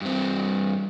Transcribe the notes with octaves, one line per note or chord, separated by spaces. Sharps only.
G2 C4